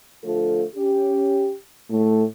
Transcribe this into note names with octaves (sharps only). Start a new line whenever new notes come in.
D3 F3 A3 F4 A4
C#4 G4
A2 A3